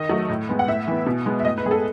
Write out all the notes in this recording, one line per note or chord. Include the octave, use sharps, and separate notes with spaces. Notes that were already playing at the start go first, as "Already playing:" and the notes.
Already playing: D#3 D#5
F#3 A3
A2
G#3 B3
F#5
A2 E5
E3 B3
B2
G#3 B3
E5
A2 D#5
B4
G#3 B3 G#4
A4